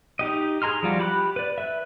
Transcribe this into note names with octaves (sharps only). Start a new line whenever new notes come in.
D#4 G4 D#5
G#4 G#5 A#5 C6 F6
F3 G3 F4 F#4
G4 B5 D6 F#6
B4 D5
B4 E5